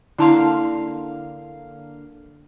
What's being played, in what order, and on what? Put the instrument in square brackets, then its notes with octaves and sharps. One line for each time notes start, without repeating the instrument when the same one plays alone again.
[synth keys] D3 A#3 F5 [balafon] E4 A5 C6